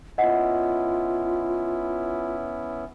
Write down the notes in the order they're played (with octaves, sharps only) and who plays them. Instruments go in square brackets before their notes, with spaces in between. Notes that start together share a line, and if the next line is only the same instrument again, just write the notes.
[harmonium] B3 C#4 E4 [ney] F4 [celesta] D#5 F#5